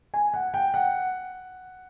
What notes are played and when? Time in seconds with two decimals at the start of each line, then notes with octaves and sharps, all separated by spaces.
0.14 G#5
0.34 F#5
0.54 G5
0.74 F#5